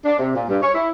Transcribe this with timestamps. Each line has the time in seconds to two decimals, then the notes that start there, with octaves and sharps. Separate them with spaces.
0.05 D4
0.19 C3
0.34 A#2
0.48 G2
0.62 C#5
0.75 E4